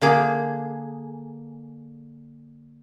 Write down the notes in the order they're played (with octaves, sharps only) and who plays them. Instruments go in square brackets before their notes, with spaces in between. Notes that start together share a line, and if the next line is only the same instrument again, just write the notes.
[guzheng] D3 A#3 G#4